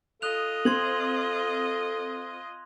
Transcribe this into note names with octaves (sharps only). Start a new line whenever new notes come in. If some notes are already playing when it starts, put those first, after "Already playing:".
F4 A4 D#5 D#6 F#6 F7
C4 C6 G#6 F#7